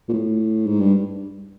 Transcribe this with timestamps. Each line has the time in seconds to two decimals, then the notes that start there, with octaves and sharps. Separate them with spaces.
0.09 A#2
0.13 A2
0.67 G#2
0.80 G2